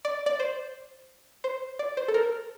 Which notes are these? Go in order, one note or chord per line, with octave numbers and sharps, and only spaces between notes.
D5
D5
C5
C5
D5
C5
A4
A#4